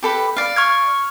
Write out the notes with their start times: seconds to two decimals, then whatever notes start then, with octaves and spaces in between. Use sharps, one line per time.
0.03 G4 A4 B4
0.37 D5 F5
0.56 C#6 F6 G#6